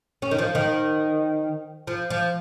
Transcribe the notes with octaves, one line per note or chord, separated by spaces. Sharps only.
C#4
D#3
F3
D#3
F3
F3